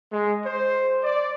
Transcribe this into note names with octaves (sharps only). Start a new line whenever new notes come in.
G#3
C5
D5